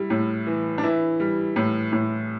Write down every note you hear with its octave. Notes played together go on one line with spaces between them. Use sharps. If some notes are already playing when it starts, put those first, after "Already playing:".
Already playing: G3 E4
A2
E3
D4
E3 E4
G3
A2
A2